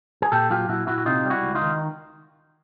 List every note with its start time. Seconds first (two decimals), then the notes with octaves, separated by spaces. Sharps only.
0.22 G#4
0.32 A#2 G4 A4
0.50 F#3 F4 G4
0.69 A#2 E4 F#4
0.87 A#2 E4 F#4
0.98 F#4
1.06 C3 D#4 F4
1.25 G3
1.30 E4 F#4
1.43 C#2
1.55 D#4 F4
1.62 D#3